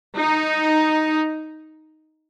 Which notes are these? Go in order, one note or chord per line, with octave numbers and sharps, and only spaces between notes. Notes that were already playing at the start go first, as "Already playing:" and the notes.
D#4